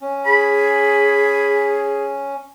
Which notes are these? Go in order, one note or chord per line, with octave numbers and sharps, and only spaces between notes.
C#4
G#4 B5